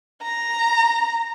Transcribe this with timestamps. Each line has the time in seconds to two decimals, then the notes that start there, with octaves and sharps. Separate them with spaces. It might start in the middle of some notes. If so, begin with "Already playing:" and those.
0.23 A#5